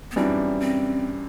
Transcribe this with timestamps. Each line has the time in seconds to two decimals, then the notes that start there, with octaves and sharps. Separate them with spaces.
0.11 B3
0.16 F#2 E3 G3 C4 D4
0.60 C4